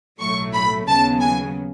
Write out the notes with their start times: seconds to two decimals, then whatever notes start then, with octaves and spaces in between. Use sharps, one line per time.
0.20 B1 A2 F#3 A3 C#6
0.53 B5
0.88 D#2 C#3 F#3 B3 A5
1.21 G#5